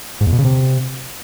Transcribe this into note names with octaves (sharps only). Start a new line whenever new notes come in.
G#2
E2
B2
C#3
C3